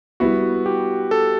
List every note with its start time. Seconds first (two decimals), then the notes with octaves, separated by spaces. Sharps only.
0.20 G3 B3 E4 F#4
0.66 G4
1.11 A4